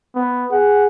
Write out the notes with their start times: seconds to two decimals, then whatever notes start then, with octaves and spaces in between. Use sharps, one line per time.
0.15 B3
0.52 G#4 F#5